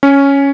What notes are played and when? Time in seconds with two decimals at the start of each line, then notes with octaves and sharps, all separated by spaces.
0.03 C#4